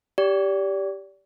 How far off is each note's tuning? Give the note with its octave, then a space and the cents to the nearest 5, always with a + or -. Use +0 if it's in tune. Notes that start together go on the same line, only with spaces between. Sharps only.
G4 +0 D5 -30